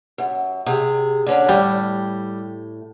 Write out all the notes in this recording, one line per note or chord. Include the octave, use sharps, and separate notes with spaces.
F#2
C3 G#4
D3 C#4 D4
A2 G3